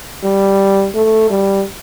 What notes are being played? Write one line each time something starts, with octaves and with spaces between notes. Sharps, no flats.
G3
A3
G3